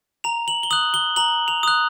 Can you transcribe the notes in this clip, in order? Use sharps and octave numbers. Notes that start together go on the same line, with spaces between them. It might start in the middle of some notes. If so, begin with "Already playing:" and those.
A#5 F7
F#7
G7
D#6 F#6 F#7
G7
A#5 F#7
F7
D#6 F#6